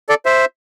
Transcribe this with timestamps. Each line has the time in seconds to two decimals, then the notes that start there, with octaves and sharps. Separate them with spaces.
0.09 A4 D5
0.26 C5 E5